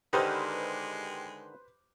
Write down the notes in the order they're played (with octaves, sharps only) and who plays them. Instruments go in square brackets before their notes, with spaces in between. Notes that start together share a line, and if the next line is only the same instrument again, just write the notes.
[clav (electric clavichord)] D3 D#3 D#4 [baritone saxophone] G#3 [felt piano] G4 [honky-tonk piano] B4 C5 F6